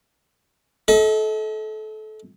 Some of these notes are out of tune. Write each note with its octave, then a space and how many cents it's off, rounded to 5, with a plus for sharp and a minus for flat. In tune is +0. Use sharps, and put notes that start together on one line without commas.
A4 -25 D#5 +40